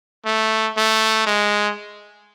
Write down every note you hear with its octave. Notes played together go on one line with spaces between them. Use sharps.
A3
A3
G#3